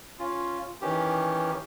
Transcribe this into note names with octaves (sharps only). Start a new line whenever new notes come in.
C#4 F4
D#3 E3 C#4 G4